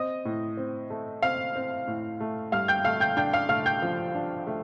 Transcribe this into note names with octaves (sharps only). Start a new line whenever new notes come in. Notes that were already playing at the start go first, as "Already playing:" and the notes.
Already playing: C4 D#5 D#6
A2
C4
A3
C4 F5 F6
C4
A2
A3
G2 F5 F6
G5 G6
A3 F5 F6
G5 G6
D4 G5 G6
F5 F6
A3 F5 F6
G5 G6
F3
D4
A3